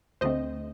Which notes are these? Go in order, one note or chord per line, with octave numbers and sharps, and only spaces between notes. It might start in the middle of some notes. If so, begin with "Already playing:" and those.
D2 D3 A3 C4 C5 D#5